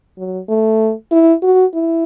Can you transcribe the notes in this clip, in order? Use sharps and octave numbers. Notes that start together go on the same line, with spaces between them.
F#3
A3
E4
F#4
E4